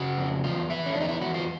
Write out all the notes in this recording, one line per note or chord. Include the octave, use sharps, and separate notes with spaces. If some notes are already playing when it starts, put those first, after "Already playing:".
Already playing: C#3 F#4
F2
E2 F4
E3 E4
C#4
E2 D4
D#4
E4
E2 F#4
F4